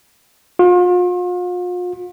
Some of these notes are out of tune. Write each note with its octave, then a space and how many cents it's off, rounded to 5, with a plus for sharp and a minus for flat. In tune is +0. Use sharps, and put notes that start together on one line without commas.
F4 +40